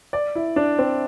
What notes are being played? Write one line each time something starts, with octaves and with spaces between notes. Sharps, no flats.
D5
E4
D4
C4